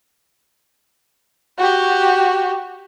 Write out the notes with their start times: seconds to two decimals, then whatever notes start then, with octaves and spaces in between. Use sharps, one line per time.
1.58 F#4 G4